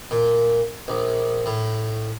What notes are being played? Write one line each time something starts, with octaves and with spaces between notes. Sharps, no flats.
A#2
A#1
A2